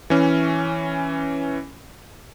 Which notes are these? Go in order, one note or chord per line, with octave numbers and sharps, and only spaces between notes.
E3 C#4